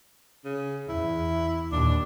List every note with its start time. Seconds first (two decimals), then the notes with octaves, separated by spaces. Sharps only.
0.45 C#3
0.89 E2 E4
1.72 D#2 A#2 D4